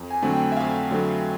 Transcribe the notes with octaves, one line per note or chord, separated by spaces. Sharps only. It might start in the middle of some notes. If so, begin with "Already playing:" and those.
Already playing: F2
G#5
D3 F#3 A3 C4
G5
E5
F2 F5
D3 F#3 A3 C4